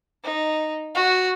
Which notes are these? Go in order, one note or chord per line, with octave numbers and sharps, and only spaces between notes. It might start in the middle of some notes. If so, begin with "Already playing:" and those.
D#4
F#4